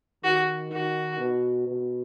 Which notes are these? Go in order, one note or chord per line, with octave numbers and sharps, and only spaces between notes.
D#3 F#4
D#3 F#4
B2
B2